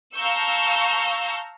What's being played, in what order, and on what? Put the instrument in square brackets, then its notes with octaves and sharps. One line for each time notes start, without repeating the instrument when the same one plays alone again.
[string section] F5 A5 A#5 C#6 E6 G6